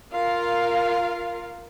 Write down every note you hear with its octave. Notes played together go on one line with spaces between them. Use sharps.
F4 A#4 F5